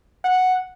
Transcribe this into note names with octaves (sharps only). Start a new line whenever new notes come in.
F#5